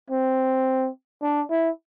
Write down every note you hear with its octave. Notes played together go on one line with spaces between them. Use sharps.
C4
D4
E4